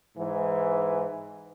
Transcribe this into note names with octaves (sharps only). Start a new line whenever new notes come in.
G#2 E3